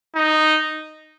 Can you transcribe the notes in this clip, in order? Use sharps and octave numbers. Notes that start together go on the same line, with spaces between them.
D#4